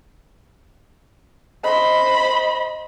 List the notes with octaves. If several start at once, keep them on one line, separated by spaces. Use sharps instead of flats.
C5 D#5 B5